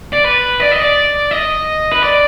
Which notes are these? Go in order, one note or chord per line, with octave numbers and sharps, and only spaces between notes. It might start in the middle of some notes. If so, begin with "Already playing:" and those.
D5
B4
D5
D#5
D5
D#5
B4
D5